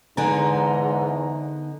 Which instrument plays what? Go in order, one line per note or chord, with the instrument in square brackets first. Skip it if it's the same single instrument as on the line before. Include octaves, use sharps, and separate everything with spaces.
[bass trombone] E2 [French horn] G#2 [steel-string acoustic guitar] D3 B3 D#4 [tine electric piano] G#5 A#5